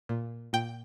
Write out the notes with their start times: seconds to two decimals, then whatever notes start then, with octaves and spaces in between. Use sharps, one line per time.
0.09 A#2
0.53 A#2 G5